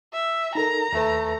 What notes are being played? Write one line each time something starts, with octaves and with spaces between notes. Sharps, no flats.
E5
D#4 A4 A#4 A#5
D#2 A3 B4